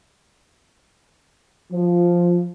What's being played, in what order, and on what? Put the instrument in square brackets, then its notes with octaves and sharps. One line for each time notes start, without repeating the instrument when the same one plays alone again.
[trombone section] F3